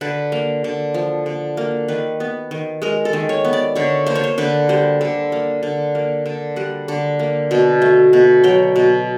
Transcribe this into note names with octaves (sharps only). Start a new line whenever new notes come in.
D3 B4
A#3
D3
F3
D3
A#3
D#3 B4
B3
D#3
G#3 A#4
A4
D#3
C#5
B3
D5
D3 C#5
A#3 C5
C#5
C5
D3 B4
G3 C5
D3
A#3
D3
A#3
D3
G3 F#5
D3
A#3
B2
A3
B2
F#3 G5
B2